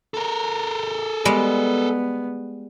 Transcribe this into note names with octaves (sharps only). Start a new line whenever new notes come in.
A4 A#4
G3 G#3 B3